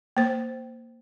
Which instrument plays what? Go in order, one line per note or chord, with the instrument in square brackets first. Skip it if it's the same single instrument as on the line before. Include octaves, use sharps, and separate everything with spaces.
[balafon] A#3 C5